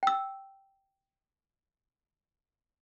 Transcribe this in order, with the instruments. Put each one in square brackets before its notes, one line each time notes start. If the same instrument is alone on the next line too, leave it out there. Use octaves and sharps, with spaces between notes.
[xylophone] G5 E6